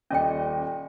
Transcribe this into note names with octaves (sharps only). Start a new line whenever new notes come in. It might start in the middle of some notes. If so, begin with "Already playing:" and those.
D#1 C#4 D5 D#5 G5